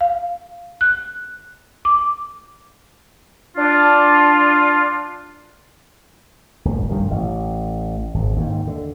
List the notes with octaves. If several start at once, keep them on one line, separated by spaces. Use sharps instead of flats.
F5
F#6
D6
D4 F4
D1 G1
F1 G2 C3 D#3
A1
G#1
D#2 G#2
D3